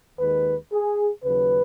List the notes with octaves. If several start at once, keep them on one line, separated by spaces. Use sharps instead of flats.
D#2 D#3 G#3 B4
G#4
D#2 C#3 F#3 B4